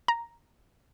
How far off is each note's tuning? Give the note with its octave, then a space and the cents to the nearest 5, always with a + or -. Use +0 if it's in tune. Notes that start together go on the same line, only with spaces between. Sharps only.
A#5 +5